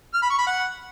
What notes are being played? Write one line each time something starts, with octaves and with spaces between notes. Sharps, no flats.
F6
B5
C#6
B5
F#5